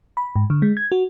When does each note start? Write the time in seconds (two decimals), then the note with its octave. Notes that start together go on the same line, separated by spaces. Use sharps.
0.17 B5
0.36 G#2
0.50 D3
0.62 G#3
0.77 G#6
0.92 F#4